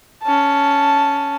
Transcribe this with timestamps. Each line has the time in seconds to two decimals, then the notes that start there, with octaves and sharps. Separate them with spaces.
0.23 C#4 A5